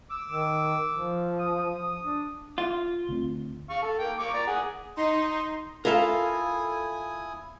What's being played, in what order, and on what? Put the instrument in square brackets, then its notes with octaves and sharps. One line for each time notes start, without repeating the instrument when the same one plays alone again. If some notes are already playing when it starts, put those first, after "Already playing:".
[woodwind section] D6 E6
[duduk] D#3
F3
[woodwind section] D#6
[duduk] D4
[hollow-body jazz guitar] F4
[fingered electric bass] D2 C4
[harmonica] F5 C#6
A4
A#3 G5
A#3 C#6 D6
D5 A#5
G#4 F#5
[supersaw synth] D#4 [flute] C6
[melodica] E4 G#5 D#6 [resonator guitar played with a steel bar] F4 A4 [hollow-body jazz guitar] A#4 E5 F5